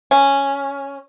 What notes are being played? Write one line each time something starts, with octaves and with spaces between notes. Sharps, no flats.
C#4